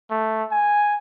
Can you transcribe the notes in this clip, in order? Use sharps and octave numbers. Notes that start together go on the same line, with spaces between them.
A3
G#5